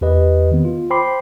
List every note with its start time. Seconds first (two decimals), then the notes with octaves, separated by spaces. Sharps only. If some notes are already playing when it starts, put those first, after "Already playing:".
0.01 E2 G4 B4 D#5
0.51 D#3 B3
0.65 F4
0.90 C5 G5 B5 C6 D6 C7